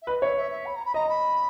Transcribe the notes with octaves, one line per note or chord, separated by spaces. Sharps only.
E5
B4 D#5
C#5 E5
E5
E5
B5
A#5
B5
D#5 A#5
B5